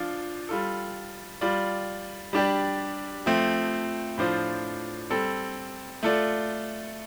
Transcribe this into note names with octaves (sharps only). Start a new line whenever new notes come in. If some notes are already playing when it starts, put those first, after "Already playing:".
Already playing: F3 D4 F4
G3 F4 A4
G3 F4 D5
G3 D4 G4 D5
F3 A3 C4
A2 F3 D4 F4 C5
G3 C4 A4
A3 F4 A4 D5